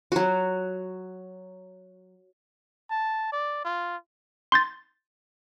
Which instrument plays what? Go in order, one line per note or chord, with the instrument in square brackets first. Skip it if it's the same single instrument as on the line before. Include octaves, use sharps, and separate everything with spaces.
[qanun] F#3 F#4
[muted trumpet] A5
D5
F4
[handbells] C6 G6 A6